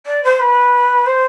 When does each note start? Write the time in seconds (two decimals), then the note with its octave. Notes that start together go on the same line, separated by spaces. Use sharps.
0.06 D5
0.23 C5
0.39 B4
1.06 C5